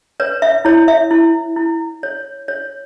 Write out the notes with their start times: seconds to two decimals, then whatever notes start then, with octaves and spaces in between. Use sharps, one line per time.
0.20 B4 C#5
0.42 E5
0.65 E4 C#5
0.88 E5
1.11 E4
1.56 E4
2.03 C#5
2.48 C#5